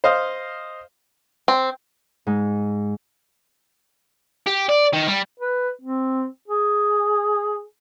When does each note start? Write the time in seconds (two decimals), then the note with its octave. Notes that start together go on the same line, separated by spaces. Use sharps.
0.04 C5 D#5 F5
1.48 C4
2.27 G#2
4.46 G4
4.69 D5
4.93 D#3
5.07 G3
5.40 B4
5.81 C4
6.48 G#4